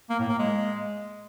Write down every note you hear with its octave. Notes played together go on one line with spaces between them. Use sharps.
A#3
A2
A#3
G#3